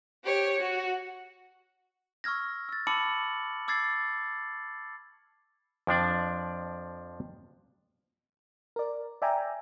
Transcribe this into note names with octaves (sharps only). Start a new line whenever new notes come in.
G4 C#5
F#4
C#6 E6 F6 G#6 A#6
E6 A6
A5 B5 D6 E6 C#7 F#7
D6 E6 G#6 A6 C7
F2 F3 D4 D5
A#4 D5
D5 E5 G5 G#5 A#5